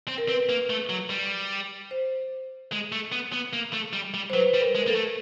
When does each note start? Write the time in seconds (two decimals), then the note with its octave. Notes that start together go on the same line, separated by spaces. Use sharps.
0.08 C4
0.18 A#4
0.29 C4 B4
0.49 A#3
0.70 A3
0.90 F#3
1.10 G3
1.91 C5
2.72 G#3
2.92 A3
3.12 B3
3.33 B3
3.53 A#3
3.73 A3
3.93 G3
4.14 G3
4.30 C5
4.34 F#3 B4
4.54 G3
4.61 A#4
4.75 G#3
4.78 A#4
4.87 A#3 A4
4.95 A3